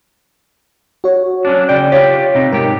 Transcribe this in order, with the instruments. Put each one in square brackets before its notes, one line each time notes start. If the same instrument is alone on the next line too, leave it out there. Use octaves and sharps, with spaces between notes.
[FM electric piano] F#4 C#5
[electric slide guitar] F#3 C#4 D4
[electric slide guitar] C#3 G5 [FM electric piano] D5
[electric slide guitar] F4 G4 [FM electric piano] C#5
[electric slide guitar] C3 D#4
[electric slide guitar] G#2 G4 [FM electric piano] A#4